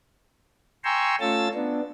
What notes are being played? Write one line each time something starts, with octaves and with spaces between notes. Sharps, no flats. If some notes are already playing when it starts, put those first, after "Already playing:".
G5 G#5 A#5 C6 C#6 E6
A3 C#4 F4 A5 E6 A6
B3 D4